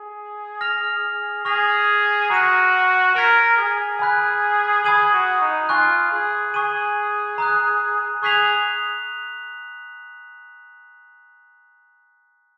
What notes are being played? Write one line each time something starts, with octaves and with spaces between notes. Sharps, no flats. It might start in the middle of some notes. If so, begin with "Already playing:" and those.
Already playing: G#4
F6 A#6 F7
G#4 C#6 F6 A#6 F7
F#4 A#5 F6 A#6 D#7
A#4 A#5 F6 G#6 B6
G#4
G#5 B5 F#6 B6
G#4 B5 D#6 G#6 D#7 F#7
F#4
D#4
F4 G#5 C#6 F#6
G#4
G#4 C#6 G#6 D#7 F#7
A#5 D#6 F#6
G#4 C#6 F#6 B6 F7